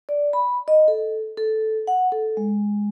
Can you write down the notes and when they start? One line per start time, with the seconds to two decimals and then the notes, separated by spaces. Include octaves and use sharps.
0.09 D5
0.33 B5
0.68 D#5
0.88 A4
1.37 A4
1.87 F#5
2.12 A4
2.37 G#3